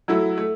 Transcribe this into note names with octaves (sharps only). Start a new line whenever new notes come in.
F#3 A3 E4
A3